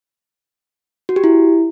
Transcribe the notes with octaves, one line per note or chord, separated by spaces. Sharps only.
F#4
G4
E4